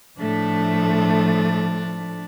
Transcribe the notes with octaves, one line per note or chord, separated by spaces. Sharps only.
A2 F3 A3 D4